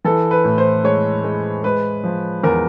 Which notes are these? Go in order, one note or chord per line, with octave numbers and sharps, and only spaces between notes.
E3 A4
B4
A2
C5
G#3 C#5
G#3
G#3 B4
F3
E2 A#4